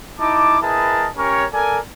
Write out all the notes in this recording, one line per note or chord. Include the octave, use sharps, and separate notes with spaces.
D#4 E4 A5 D6
E4 G#4 A#4 B4 D#5 A5
C#4 G4 A#4 C#5
A4 A#4 D5 G#5